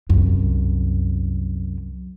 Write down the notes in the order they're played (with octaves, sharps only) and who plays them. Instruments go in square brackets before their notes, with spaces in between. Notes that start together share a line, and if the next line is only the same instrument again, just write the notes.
[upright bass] C2 F#2